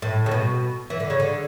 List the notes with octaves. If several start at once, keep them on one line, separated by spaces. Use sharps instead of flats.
A2
C#3
B2
E3
D3
C#3
D3